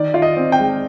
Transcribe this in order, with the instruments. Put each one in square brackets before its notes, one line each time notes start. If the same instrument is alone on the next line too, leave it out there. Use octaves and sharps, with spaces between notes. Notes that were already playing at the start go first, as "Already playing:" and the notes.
Already playing: [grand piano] D#3 D5
F4
D#5
C4
G5
G#3